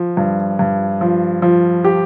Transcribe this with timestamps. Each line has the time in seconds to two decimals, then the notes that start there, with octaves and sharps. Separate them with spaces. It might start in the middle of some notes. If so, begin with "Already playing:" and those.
Already playing: F3
0.17 G2
0.59 G2
1.01 F3
1.42 F3
1.84 G4